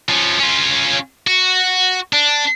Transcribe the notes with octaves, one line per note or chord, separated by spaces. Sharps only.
F3 C#4
C#4 F4
F#4
D4